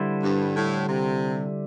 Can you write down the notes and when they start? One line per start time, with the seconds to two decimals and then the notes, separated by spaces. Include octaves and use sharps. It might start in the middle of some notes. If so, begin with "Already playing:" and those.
Already playing: D3 G3 E4 C5
0.23 G2
0.55 A2
0.88 C3